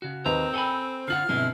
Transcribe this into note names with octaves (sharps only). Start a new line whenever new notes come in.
C#3 F#4
D#2 C4 B4 D#5 A#5
A4 G5 G#5 B5
D3 F4 F#5 F6 C7 F#7
G1 B2 C4 E4 G#4